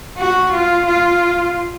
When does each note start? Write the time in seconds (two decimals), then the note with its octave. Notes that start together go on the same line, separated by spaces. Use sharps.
0.18 F#4
0.53 F4
0.87 F4